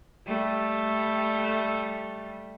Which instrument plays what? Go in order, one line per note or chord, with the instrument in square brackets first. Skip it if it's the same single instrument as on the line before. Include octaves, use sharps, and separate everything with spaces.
[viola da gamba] G3 A3